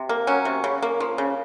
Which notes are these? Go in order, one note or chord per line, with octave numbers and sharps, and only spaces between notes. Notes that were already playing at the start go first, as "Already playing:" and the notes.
Already playing: C3
A#3
F#3 C#4
C3
C#3
A#3
F3
C#3